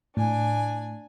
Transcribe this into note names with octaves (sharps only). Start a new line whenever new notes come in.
A2 D4 G#5